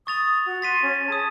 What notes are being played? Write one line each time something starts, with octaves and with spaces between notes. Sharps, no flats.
C#6 D#6 A6 F7
F#4
C6 A6 B6 D#7
C#4
G#4 A5 D#6